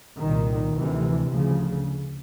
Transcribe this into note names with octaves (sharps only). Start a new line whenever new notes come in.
C2 A#2 D#3
D2 C3 E3
D2 C#3 F3